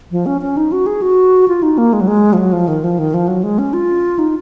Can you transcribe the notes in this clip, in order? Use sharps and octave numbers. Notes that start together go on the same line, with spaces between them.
F3
C#4
C#4
D#4
F#4
G#4
F#4
F4
D#4
A#3
G#3
F#3
G#3
F3
F#3
F3
D#3
F3
D#3
F3
F#3
G#3
C#4
F4
D#4